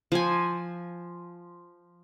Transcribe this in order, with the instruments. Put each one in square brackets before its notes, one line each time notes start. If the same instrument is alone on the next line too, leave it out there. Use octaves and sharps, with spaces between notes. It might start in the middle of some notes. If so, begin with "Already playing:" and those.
[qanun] F3 G#5